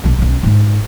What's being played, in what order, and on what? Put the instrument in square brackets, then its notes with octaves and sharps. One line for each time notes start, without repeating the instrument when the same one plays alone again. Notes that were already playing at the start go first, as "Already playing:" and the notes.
[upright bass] B1 D4
B1 C#4
G#2 G#3